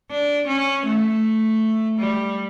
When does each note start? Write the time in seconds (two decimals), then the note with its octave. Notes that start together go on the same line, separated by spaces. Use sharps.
0.11 D4
0.48 C#4
0.86 A3
1.99 G3